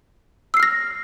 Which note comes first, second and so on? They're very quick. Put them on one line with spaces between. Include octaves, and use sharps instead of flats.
E6 C7 F6 A#6